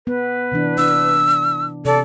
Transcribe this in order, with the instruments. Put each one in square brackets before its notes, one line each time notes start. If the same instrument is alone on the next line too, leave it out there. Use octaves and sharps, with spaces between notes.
[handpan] B3 [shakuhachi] B4
[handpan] C3 E3 D4
[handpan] D4 [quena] E6
[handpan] C3 [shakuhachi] A4 [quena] D5